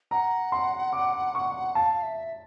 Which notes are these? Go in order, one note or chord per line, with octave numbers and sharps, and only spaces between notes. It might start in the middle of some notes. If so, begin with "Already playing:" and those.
F#5 A#5
C6
D6
C#6
F5 A5
E5